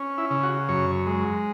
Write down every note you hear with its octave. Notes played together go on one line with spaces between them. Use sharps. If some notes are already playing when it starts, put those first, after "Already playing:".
Already playing: C#4
E4
C#3
F#4
F#2 C#5
G#3